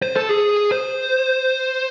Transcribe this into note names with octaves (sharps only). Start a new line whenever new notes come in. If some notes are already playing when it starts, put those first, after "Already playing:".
C5
A4
G#4
C5